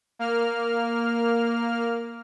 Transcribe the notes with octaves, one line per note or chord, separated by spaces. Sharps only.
A#3 F6